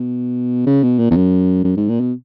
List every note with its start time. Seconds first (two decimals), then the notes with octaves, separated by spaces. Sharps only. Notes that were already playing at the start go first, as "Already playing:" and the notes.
Already playing: B2
0.67 C#3
0.83 B2
0.99 A#2
1.11 E2
1.16 F#2
1.64 F#2
1.77 G#2
1.89 A#2
2.01 B2